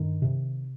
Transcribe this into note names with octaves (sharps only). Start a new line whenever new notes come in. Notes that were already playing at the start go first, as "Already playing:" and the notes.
Already playing: G2 D#3
C3